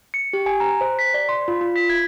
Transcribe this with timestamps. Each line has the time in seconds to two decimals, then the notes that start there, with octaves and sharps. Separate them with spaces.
0.14 C#7
0.33 G4
0.46 G#5
0.60 A#5
0.81 C5
0.99 B6
1.14 D5
1.29 C6
1.48 F4
1.61 F4
1.76 B6
1.90 G#6